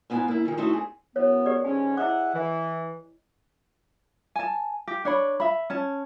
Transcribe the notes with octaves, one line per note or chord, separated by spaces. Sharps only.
G#2 B3 E4 F5 G#5 A#5
A#3 E4
D#3 E3 G3 F4
A3 C4 D#4 E4 F#4
C4 G#4
F#2 E3 B3 C#5
G4 G#4 D5
G#2 D3 C#4 G#5
E4 G#4 D#5 E5 F#5 D6
E3
G#5 A5
G4
D4 C#5 B5
E5 B5
C#4 A5